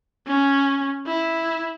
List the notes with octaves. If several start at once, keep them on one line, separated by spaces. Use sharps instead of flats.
C#4
E4